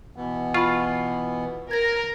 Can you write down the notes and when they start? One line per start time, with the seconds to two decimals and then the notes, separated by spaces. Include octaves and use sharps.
0.16 B2 E3 B3
0.54 F4 B5 C#6
1.71 A#4 G#6 A#6